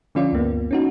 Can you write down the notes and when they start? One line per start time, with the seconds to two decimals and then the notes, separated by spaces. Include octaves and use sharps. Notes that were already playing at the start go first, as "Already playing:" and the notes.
0.15 D3 F3 C#4 F4 D5
0.32 D2 G2 A#3 B3
0.71 C#4 D#4 F#4